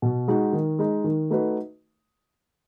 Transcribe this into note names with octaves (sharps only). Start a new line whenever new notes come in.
B2
G#3 D#4 F#4
D#3
G#3 D#4
D#3
A3 D#4 F#4 B4